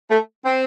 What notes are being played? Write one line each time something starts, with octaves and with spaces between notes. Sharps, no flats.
A3
C4